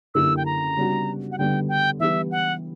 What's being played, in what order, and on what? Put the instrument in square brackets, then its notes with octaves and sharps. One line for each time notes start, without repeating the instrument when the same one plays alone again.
[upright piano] F#2 D3 A#3 E4 G4 [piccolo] E6
[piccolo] G5
A#5
[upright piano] C#3 G3 B3 D4 F#4
[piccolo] F#5
[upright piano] D3 G3 B3 [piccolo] G5
[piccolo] G5
[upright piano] E3 G3 B3 E4 G4 [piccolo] E5
[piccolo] F#5